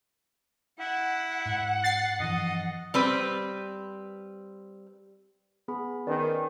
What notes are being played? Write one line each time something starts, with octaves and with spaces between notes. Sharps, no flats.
E4 F#5
G#2
A6 C7
G2 E3 F3 D#5
G3 C4 B4
B3 G#4 B5
D#3 C#4 B4 D5